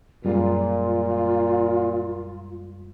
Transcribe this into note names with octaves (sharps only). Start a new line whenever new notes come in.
F#2 A#2 G3 G#3 F4